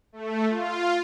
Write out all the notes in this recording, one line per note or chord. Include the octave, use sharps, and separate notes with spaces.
A3
F4